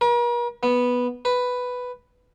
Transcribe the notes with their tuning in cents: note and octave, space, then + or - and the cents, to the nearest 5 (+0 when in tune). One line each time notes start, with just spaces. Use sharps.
A#4 +45
B3 -5
B4 +5